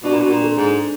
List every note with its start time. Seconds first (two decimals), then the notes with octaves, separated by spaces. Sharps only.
0.03 B2 D4
0.12 A#2
0.20 B2
0.30 A#2
0.43 A4
0.57 G#2